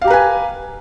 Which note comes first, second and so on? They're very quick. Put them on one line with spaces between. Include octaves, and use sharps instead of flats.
F5 G4 A#5 B4 G#5